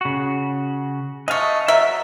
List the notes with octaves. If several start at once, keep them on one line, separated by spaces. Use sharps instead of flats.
C#3 F#4
G#3 A3 D#5 F5 C#6
F#3 A#4 E5